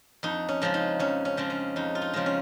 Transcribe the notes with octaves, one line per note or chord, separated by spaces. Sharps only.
F2 D#4
C#4
C#3 F3 G#3
D#4
F2 C#4
C#4
C#3 F3 G#3
C#4
F2 D#4
F4
D#4
C#3 F3 G#3
C#4